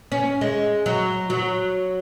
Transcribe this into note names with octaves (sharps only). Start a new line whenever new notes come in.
C#4
G#3
F#3
F#3